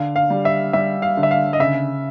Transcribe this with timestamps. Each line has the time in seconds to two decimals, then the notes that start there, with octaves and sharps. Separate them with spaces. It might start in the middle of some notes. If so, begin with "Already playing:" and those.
Already playing: D3 F5
0.16 F5
0.30 G3
0.45 E5
0.73 G3 E5
1.02 F5
1.17 D3
1.23 E5
1.31 F5
1.53 D#5
1.59 C#3 E5